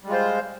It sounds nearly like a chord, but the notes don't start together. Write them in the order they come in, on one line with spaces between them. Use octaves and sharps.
G3 G#3 F4 C5